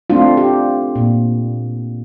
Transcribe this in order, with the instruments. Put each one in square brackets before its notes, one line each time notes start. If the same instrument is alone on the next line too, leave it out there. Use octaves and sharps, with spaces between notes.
[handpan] A3 C4 D4 F4
G4
A#2